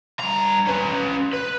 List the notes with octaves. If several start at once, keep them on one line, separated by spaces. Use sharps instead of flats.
G2 A#5
C#4 B4
B4